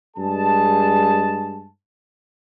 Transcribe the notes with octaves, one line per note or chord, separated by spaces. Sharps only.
G2 G#3 G#4 A5